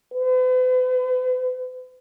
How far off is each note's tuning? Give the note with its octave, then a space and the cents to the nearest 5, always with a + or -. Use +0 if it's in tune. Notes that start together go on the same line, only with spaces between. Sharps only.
B4 +45